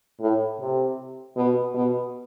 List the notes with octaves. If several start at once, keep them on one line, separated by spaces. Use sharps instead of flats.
A2
C3
B2
B2